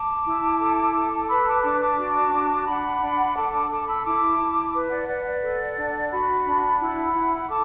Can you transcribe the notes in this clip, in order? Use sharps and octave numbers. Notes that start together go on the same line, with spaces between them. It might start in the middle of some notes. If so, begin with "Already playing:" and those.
Already playing: A5 D6
E4
A4
A4
B4 B5 E6
A5 D6
D4 A5 D6
A5 D6
F#4
D4
D4 F#5 B5
D4
A4 A5 D6
A5 D6
A4 A5 D6
B5 E6
E4 A5 D6
E4
B4
D5 F#5
B4 D5 F#5
D5 F#5
A4
D4
F#4 F#5 B5
D4
E4 F#5 B5
E4
A4 A5 D6